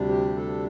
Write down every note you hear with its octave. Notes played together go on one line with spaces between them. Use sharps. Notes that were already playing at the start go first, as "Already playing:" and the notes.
Already playing: D2 C3 G3 D4
G4
A4